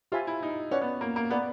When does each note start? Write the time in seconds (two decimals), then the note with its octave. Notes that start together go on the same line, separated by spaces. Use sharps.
0.12 F4 G4 C5 E5 G#5 B5
0.27 E4
0.43 D#4
0.71 C#4 B4 D5 F#5
0.81 B3
1.01 A#3
1.16 A#3
1.30 B3 B4 D5 F#5